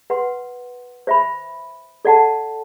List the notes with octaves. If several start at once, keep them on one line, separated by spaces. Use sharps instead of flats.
B4 F#5 C6
C5 E5 B5
A4 D5 F#5 A5